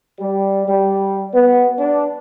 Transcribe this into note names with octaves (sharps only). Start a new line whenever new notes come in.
G3
G3
B3
D4